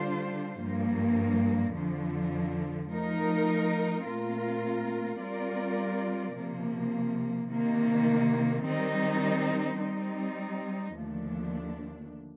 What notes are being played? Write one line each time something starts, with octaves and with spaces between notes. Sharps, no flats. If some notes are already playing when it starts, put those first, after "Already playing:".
Already playing: D3 G3 D4 F4 C5
G2 F3 A#3
F2 D3 F3
F3 A3 D#4 A#4
A#2 A3 C4 F4 A#4
G3 C4 F4 A#4 D5
C3 F3 A#3
C3 D#3 A#3
D#3 G3 C4 D#4
G3 C4 D#4
D#2 D3 F3 A3 D4